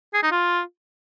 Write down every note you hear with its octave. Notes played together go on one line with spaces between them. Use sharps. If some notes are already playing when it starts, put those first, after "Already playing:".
G#4
D#4
F4